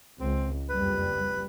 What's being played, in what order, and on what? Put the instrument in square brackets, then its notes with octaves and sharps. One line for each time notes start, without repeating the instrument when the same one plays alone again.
[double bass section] C#2 [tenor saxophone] C4
[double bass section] F#1 F2 G3 [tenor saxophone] B4